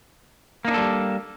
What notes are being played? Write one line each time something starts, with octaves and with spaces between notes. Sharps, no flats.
G3 A#3 D4 D#4 A4